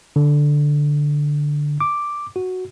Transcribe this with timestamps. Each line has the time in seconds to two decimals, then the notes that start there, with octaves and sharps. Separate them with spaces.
0.16 D3
1.81 D6
2.36 F#4